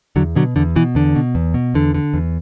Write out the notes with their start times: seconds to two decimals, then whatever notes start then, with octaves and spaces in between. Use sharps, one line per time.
0.16 E2 D3 F#3
0.36 B2 D3 F#3
0.56 E2 D3
0.76 B2 E3
0.95 E2 D3
1.16 B2
1.35 E2
1.54 B2
1.74 E2 D3
1.94 D3
2.14 E2